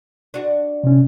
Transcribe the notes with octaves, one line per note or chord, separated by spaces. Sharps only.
D4 F#4
C3 C#4